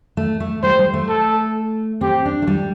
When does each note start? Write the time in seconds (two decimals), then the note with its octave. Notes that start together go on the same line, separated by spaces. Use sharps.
0.17 A3
0.40 A3
0.63 G3 C5
0.79 G3
0.94 A3
1.09 A4
2.01 C4 G4
2.25 D4
2.42 A3
2.47 G3